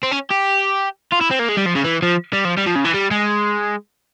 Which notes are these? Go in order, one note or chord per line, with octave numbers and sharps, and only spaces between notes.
C4
C#4
G4
F4
E4
C4
A#3
G#3
G3
F3
C#3
E3
F3
G3
F3
G3
F3
C#3
E3
G3
G#3